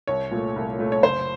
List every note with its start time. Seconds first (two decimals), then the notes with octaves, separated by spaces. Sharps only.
0.07 C2 C#5
0.31 A#2 A3
0.56 C2
0.79 A#2 A3
0.92 C#5
1.03 F#1 C5